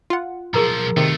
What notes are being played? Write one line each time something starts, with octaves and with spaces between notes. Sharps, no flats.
F4 F#5
B1 F3 G#4 A#4 A#5
C3 D#3 A3 F4